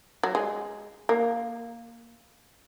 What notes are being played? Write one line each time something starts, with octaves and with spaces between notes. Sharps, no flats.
F#3
G#3
A#3